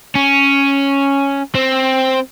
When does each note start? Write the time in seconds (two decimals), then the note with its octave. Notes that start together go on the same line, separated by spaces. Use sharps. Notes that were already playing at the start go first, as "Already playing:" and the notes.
0.15 C#4
1.55 C4